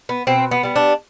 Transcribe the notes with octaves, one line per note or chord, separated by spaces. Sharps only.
B3
B2 C4
B3
G3 B3
D4